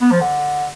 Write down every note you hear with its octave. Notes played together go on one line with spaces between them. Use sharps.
B3
F3
D3